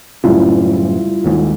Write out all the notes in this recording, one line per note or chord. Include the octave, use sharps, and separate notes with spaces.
F#2 A2 C#3 G3 E4 F4
G#1 D#2 G#2